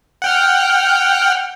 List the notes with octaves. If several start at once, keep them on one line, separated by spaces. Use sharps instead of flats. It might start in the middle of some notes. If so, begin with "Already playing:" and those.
F#5 G5 F6